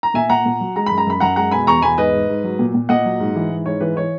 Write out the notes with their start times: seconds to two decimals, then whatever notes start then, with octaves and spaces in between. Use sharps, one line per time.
0.03 A#5
0.14 A#2 E5 G#5
0.30 A#2 F#5 A#5
0.46 A#2
0.61 F#3
0.76 G#3 A#5
0.86 F#2 B5
0.98 A#5
1.07 F#2 B5
1.20 F#2 F#5 A#5
1.36 G#3 F#5 A#5
1.51 B2 G#5 B5
1.67 E2 A#5 C#6
1.82 E2 G#5 B5
1.97 G#2 B4 D#5
2.13 G#2
2.29 G#2
2.44 F#3
2.59 A#2
2.74 A#2
2.89 A#2 D#5 F#5
3.05 F#3
3.20 G#2
3.35 E3
3.51 G#2
3.65 G#2 C#5
3.81 E3 B4
3.96 E3 C#5